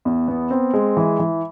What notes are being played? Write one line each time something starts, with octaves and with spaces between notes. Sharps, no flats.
E2
B3
C4
G#3
E3
E3